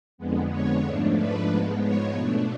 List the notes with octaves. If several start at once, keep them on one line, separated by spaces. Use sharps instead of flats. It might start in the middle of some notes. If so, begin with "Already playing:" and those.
F2 D3 G#3 B3
C#5
G#2 F3 A3 D4
B4
G#2 F3 G#3 B3
C#5
B2 A3 D4